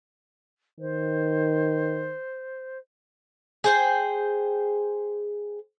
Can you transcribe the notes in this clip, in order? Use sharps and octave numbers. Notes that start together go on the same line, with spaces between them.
D#3 C5
G#4 C5 G5